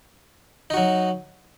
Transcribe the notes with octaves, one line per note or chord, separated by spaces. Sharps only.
F#3 D#4 F#4